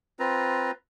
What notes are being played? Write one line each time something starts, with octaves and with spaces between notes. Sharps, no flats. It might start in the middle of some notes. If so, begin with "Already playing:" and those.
C4 F4 B4 A#5